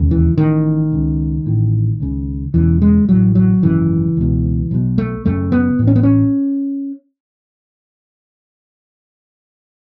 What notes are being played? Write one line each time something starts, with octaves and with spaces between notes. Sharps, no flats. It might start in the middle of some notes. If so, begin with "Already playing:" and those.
Already playing: E1 D#2 C#3
E3
A1 A2 D#3
C#2 C#3
A1 A2
C#2 C#3
E1 E2 C#3 E3
G#3
A1 A2 F#3
F#3
G#1 F#2 C#3 E3
C#2 B2
B1 B2
A3
F#1 F#2 C#3 A3
B3
A1 A2
C#4
B3
C#4